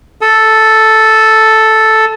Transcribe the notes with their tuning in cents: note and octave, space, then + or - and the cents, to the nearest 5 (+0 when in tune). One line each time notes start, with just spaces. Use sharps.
A4 +0 D#6 +45